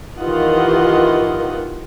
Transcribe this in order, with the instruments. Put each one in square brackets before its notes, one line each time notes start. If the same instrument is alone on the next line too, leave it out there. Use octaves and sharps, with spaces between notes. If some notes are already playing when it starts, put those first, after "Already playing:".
[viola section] D#3 E3 F4 G4 D#5 F#5